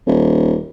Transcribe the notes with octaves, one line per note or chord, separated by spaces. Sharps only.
D#1